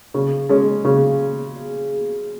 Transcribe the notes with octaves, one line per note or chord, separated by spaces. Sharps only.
C#3
G#3 C#4
C#3